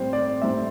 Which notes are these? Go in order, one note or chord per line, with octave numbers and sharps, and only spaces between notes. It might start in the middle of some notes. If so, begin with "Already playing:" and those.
Already playing: A2 G3 C4 C5
D5
A2 G3 C4 E5